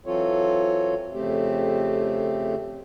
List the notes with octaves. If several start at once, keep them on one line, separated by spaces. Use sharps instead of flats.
E3 F#3 C4 F4 A4 C#5
F2 C#3 A3 C4 G4